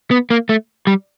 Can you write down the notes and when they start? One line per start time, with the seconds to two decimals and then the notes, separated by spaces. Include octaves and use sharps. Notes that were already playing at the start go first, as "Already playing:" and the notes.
0.11 B3
0.30 A#3
0.49 A3
0.87 G3